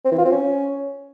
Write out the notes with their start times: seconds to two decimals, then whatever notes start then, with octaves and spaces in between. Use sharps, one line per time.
0.05 C4
0.12 E3
0.18 F4
0.25 C4
0.32 C#4